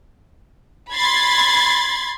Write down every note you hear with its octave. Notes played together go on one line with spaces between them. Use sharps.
B5 C6 G#6 A6